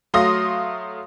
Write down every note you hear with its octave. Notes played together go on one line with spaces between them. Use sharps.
F#3 A3 F5 C6 D#6 A#6